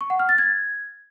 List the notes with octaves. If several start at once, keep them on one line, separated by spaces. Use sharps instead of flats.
C#6
F#5
F6
A6
G#6